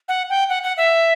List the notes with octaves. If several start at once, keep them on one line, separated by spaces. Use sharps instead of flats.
F#5
G5
F#5
F#5
E5